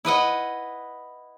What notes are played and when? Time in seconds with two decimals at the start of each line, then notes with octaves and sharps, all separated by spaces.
0.05 E4 B4 D#5 F#5